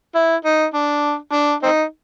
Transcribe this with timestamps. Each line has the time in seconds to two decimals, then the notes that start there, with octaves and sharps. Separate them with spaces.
0.15 E4
0.45 D#4
0.74 D4
1.33 D4
1.63 C4 D#4